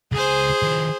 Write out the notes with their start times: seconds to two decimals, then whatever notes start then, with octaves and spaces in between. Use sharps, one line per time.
0.12 C#2 G#4 C5 G#5
0.63 D#3 F3